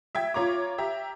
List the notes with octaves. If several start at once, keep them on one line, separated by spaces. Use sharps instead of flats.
E5 G5 G#6
F4 C#5 A#5 D6
G4 E5 A#5